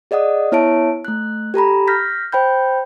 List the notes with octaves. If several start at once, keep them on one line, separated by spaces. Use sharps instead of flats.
G#4 D5 D#5 F#5 D#6
B3 E4 C#5 E5 A5 D7
A3 F#6
G4 A4 A#5 B5
F6 G6 A#6 B6
C5 G5 B5 G6